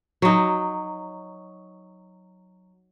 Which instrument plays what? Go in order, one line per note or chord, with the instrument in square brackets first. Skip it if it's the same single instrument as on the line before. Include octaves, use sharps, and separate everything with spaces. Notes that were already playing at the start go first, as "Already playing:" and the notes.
[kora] F#3 D#4